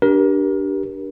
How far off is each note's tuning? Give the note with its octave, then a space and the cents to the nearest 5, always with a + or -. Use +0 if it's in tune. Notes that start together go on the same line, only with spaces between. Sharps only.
D4 +0 G4 -10 A#4 +30